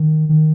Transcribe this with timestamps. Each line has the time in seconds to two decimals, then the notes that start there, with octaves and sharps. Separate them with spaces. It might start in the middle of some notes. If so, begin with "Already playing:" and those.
Already playing: D#3
0.29 D#3